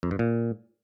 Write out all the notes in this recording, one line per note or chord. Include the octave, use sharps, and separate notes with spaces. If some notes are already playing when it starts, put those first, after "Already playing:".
F2
G2
A#2